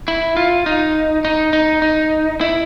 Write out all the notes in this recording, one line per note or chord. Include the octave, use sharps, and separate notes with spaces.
E4
F4
D#4
D#4
D#4
D#4
E4